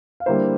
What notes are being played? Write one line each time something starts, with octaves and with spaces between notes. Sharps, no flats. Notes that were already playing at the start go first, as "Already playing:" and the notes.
F5
D3 G3 A#3 E4 C5 E5